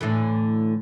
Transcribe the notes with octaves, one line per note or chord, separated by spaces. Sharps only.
A2 D3 E3